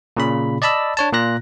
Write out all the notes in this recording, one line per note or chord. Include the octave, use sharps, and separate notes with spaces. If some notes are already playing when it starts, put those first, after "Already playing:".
A#2 C#3 B5
D5 D#5 A5 B5 E6
D4 C#5 A5
A#2 F4 F#6 A#6